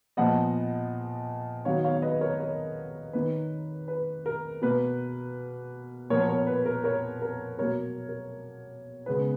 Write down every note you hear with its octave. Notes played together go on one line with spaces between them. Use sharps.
A#2 F3 B3 D#5 F#5
D#3 F#3 B3 C#5 F5
C#5 F5
B4 D#5
A#4 C#5
A#4 C#5
D#3 A#3 B4
B4
A#4
B2 A#3 B4
A#2 F3 B3 A#4 C#5
A#4 C#5
B4
A#4
A#4 C#5
A#4
B2 F#3 A#3 A#4 C#5
A#4
C#3 G#3 B3 B4